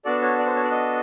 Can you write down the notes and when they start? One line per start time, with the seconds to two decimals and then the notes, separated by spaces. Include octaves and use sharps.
0.05 B3 D4 F#4 A4 D5
0.22 C#5
0.39 D5
0.46 C5
0.56 C#5
0.64 D5
0.71 D#5